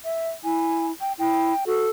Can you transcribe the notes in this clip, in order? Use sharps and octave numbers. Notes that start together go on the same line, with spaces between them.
E5
E4 G#5
G5
E4 G5
F#4 A4